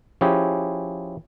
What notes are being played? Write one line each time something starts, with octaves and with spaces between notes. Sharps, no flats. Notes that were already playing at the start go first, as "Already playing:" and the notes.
F3 C#4 E4 G4 G#4